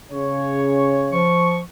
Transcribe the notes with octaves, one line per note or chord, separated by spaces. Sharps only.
C#3 C#5
F3 C#6